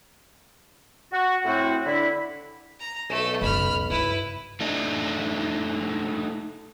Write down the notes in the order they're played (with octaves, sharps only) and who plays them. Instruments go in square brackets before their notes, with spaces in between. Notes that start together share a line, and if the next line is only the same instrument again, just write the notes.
[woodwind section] F#4
A2 C4 F#4
D3 E4 B5
[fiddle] A#5
[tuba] B1 [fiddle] A3 A4
[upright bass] C#2 F#2 [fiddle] B5 F6
[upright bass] G2 [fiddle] E4 B4
[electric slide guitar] A3 D4 D#4